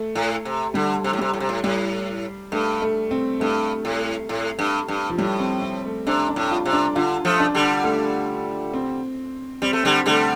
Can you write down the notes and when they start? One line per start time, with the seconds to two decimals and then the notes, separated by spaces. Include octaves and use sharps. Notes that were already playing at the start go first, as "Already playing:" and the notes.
Already playing: A3
0.15 A2
0.45 C3
0.74 D3 G3
1.04 C3
1.13 A2
1.19 C3 G3
1.33 A2
1.40 C3
1.49 A2
1.63 A2 G3
2.52 G2 A3
2.82 A3
3.11 C4
3.40 G2 A3
3.85 A2
4.29 A2
4.59 G2
4.88 G2
5.10 F3
5.18 A2 G3
5.40 C4
5.62 C4
5.85 A3
6.07 C3 D4
6.28 D4
6.36 A2
6.51 F4
6.65 C3
6.73 D4
6.95 D3 F4
7.25 F3 A3
7.40 D4
7.55 D3 G3
7.84 A3
8.74 C4
9.62 G3 C4
9.73 A3
9.84 D3 G3 C4
10.06 D3 G3 A3